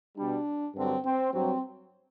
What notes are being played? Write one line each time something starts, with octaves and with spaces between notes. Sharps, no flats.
B2 G3 D4
G2 D3 F#3 C4
C4
G2 F#3 C4